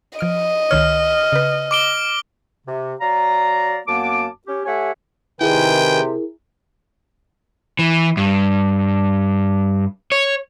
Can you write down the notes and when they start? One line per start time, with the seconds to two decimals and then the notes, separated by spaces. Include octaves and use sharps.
0.19 F3 D#5 F6 D7
0.71 C#2 D#3 C#5 F6
1.32 C#3 B4
1.71 D6 D7 G7
2.67 C3
3.00 F#3 D5 F5 A#5
3.87 F#2 A#3 B3 A5 D6
4.47 C#4 G4
4.66 A3 G4 C#5 E5 F#5 G#5
5.41 C3 D#3 E4 G#4 A#4 B4 G5 G#5
7.79 E3
8.17 G2
10.12 C#5